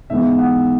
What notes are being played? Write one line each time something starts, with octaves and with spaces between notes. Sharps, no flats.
G#2 E3 G#3 B3 E5
F#5